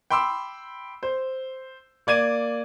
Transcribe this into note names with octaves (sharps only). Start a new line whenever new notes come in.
G5 B5 C6 D6 E6
C5
A#3 D5 G#6 D#7